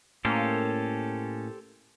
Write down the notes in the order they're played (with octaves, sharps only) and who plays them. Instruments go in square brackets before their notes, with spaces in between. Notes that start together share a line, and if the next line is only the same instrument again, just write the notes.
[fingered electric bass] A2 [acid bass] A#3 [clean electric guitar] C#4 [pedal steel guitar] G4 A4 C5